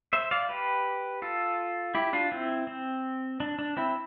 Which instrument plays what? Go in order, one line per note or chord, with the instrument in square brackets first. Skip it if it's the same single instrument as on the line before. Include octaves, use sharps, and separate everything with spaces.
[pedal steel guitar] C5 E5
D5 F5
G4 B4
F4 A4
E4 G4
D4 F4
C4 E4
C4
D4
D4
C4 E4